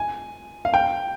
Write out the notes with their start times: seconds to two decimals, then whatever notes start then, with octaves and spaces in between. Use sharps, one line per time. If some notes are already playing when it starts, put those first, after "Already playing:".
Already playing: G#5
0.65 F5
0.74 G5